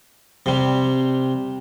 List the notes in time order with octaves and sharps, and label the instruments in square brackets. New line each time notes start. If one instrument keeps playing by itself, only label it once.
[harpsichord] C3 G3